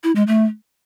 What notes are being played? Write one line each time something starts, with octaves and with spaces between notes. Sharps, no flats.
E4
G#3
A3